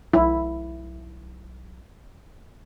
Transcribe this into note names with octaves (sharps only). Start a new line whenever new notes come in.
B1 E4